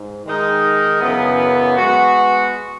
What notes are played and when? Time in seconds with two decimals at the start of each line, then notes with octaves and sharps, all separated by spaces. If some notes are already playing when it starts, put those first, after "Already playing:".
Already playing: G#2
0.26 D#3 G#3 D#4 A#4 D#5
1.01 F#2 C#3 E3 B3
1.77 G#3 B3 F#4